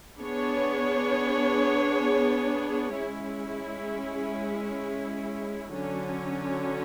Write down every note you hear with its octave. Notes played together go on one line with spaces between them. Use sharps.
B3 D4 G#4 C#5
G#3 C#4 E4
D3 F#3 C#4